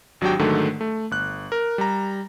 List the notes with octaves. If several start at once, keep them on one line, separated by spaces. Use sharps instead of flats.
G#1 F#3 D4 F#4 G4 G5
G#2 D3 D#3 F#3 A3
A3
G1 F#6
A#4
G3 A#5